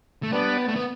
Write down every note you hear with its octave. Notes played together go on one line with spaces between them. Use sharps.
A3
G3 B3 D4 B4 D5
A3
B3